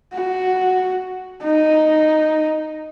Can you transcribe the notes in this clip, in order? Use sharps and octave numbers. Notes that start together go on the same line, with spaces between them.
F#4
D#4